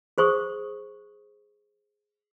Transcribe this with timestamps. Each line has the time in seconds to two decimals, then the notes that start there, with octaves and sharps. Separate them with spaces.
0.18 G#4 C5 C#6 D#6